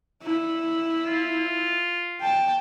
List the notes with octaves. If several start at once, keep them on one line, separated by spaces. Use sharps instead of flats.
E4
F4
G5 A5